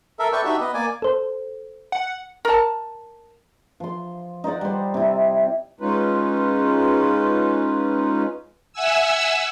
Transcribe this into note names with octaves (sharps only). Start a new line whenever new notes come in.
A4 A#4 E5
A4 B4 D5 E5 G5 C#6
D4 D#4 F#4 G4 E5
B3 B4 D#5
A#3 D5 G#5
A4 C5
F#5
A#4 A5
F3 C6
D#4 C5 D5 F#5
G3 C5
C3 E4
G#3 C#4 D#4 F4 B4
E5 F#5 G#5 E6